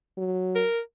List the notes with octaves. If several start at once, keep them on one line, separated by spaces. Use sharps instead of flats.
F#3
A#4